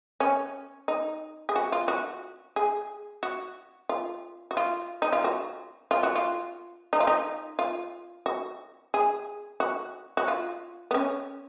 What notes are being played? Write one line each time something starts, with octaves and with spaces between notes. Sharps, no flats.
C#4
D#4
G#4
F#4
F4
F#4
G#4
F#4
F4
F#4
F4
D#4
F4
F#4
F4
F#4
F4
D#4
F4
D#4
F4
F#4
G#4
F#4
F#4
F4
B3
C#4